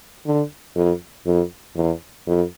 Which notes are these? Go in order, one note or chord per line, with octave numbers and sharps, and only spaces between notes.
D3
F2
F2
E2
F2